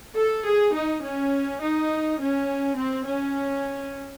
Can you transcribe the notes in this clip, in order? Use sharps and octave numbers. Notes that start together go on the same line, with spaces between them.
A4
G#4
D#4
C#4
D#4
C#4
C4
C#4